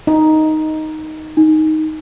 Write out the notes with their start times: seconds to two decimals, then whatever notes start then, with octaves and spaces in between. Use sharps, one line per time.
0.07 D#4
1.37 D#4